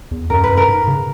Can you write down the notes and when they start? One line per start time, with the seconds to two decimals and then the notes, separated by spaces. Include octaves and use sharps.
0.11 E2
0.30 F#2 A#4
0.44 B4
0.49 F#2
0.57 A#4
0.68 G#2
0.87 C#3